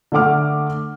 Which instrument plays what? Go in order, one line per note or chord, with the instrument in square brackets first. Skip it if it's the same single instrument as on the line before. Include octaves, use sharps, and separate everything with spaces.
[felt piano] D3 A3 F#5 D6 F6